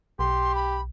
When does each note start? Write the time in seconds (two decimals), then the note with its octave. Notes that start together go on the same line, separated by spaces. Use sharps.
0.19 B1 G4 C6
0.55 B5